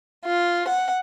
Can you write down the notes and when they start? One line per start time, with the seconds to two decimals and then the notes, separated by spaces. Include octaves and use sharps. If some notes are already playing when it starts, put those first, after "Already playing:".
0.25 F4
0.68 F#5